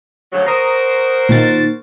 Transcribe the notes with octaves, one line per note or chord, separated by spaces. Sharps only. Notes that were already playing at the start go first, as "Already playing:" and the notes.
D2 C#3 F#3
F#4 A#4 C5 A#5 D#6
A#2 D#3 A6